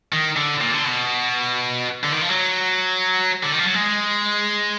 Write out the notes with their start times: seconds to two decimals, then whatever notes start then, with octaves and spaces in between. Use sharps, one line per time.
0.13 D#3
0.36 D3
0.61 A#2
0.74 D3
0.85 B2
2.04 D3
2.12 D#3
2.22 F3
2.29 F#3
3.44 D3
3.52 D#3
3.59 F3
3.67 F#3
3.74 G#3